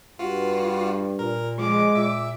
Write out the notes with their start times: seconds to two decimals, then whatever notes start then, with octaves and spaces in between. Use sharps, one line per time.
0.19 G2 F4 F#4
1.19 A#2 A#4
1.59 F3 G#3 D6
1.95 A#2 E5